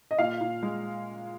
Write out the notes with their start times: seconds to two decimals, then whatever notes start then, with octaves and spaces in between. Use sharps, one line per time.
0.11 D#5
0.19 A#2 F5
0.41 A#2
0.63 G#3